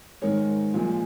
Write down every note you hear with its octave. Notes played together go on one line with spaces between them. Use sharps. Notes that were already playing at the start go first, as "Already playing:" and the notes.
G#2 D#3 G#3 A#4 C#5
A#2 F3 G#3